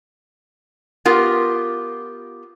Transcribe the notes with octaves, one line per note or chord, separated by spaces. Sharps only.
B3 F4 G4 A#4